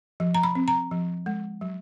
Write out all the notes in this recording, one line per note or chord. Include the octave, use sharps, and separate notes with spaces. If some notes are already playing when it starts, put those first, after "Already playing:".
F3
A#5
B5
C4
A#5
F3
G#3
F#3